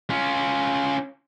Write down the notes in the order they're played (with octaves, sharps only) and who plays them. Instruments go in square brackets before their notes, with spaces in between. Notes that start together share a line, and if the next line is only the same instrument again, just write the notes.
[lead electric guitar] C#4 F4